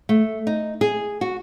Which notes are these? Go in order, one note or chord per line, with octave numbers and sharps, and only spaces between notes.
A3
D#4
G#4
F#4